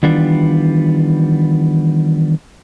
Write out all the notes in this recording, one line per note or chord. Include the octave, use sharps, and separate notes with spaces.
D#3 E3 G3 B3 D4 F4